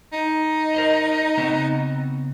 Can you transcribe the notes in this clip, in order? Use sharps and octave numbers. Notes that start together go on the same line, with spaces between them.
D#4
A#4 C5 D#5
C#3 B3 C4